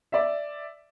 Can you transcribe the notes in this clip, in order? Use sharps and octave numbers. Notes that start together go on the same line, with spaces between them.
D5 E5